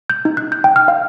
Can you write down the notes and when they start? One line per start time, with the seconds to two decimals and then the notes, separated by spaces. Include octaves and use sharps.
0.10 G6
0.25 D#4
0.37 F#6
0.52 G6
0.64 G5
0.76 F6
0.88 F5